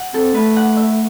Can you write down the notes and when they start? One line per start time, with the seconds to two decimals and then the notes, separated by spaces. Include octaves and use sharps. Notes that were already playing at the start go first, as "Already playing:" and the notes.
Already playing: F#5
0.14 C4 A4
0.34 A3 B4
0.56 F#5
0.77 E5